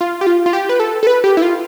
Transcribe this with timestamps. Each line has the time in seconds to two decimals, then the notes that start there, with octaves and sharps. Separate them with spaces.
0.01 F4
0.21 G4
0.27 F4
0.46 F4
0.53 G4
0.69 B4
0.80 A4
1.03 A4
1.07 B4
1.24 G4
1.37 E4
1.42 F4